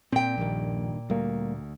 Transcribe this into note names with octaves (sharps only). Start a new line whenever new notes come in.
A#2 C4 G5
D#1 A#1 G2 D#3
D2 G3 A#3